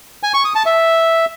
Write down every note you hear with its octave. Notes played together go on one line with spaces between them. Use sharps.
G#5
C#6
D#6
A5
E5